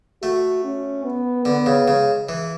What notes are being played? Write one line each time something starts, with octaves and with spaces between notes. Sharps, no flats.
A3 F#4
C#4
B3
D3 B3
C#3
C#3 G#3
E3